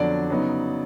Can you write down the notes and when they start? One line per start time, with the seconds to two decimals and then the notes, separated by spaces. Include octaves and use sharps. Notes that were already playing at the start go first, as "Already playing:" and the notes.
Already playing: F2 D3 F#3 B3 D4 D5
0.30 C#3 F#3 B3 D#4